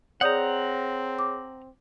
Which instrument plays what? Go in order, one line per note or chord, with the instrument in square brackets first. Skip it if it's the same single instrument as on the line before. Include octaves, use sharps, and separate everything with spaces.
[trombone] C4 [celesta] G#4 C#5 [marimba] D5 D#6 G6 [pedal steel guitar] F#5 A#5
[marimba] D6